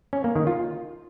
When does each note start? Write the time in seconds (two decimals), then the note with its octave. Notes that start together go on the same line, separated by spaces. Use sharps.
0.13 C#4
0.24 A#3
0.36 D#3
0.47 F4